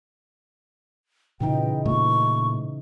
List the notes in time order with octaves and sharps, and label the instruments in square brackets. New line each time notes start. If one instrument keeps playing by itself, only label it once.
[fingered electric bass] A#2 [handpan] C#3 E3 D#4 [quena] G5
[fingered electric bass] A#2 A3 A#3 [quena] C#6